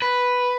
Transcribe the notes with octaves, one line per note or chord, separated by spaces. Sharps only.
B4